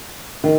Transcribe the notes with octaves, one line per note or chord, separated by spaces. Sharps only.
D#3